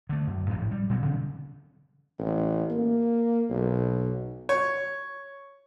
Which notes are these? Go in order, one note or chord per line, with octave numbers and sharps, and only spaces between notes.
D3 A3
F#2
A1 A2 E3 F3
G3
A#2 F#3 B3
C#3 E3 G3 C4
A1
A#3
B1
C#5